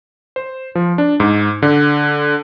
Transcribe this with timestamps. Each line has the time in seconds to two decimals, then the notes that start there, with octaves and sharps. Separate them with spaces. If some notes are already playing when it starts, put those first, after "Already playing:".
0.36 C5
0.75 F3
0.98 D4
1.20 G#2
1.62 D3